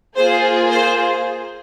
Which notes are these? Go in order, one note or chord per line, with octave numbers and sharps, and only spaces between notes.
A#3 F4 G#4 C5
C5